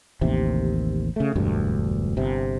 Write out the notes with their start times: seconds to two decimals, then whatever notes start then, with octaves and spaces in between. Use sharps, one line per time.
0.21 A1 D#2 C3
1.16 C#3 A3
1.35 E1 D2 G2
2.17 G1 C3